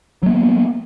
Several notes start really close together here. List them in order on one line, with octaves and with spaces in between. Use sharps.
F#3 A#3 B3